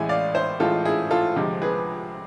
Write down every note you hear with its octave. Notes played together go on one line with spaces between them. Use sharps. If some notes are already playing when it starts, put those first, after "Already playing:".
Already playing: A1 A2 G#3 E5 G#5
D5 F5
C5 E5
A1 A2 G#3 F4 A4
E4 G#4
F4 A4
D2 C3 F3 G#3
G#4 B4